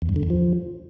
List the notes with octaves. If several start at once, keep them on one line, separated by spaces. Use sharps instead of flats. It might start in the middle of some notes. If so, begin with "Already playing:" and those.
E2
G2
D3
E2
F3